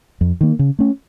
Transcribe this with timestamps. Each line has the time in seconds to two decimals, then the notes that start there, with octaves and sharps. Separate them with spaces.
0.21 F2
0.41 D#3 A#3
0.59 C#3
0.79 A3 C#4